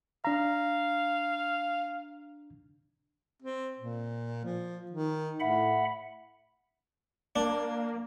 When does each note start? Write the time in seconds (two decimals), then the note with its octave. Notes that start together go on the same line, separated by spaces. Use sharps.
0.25 D4 F5 A#5
3.42 C4
3.79 A#2
4.45 F3
4.91 D#3
5.40 A2 E5 F#5 B5
7.36 A#3 D4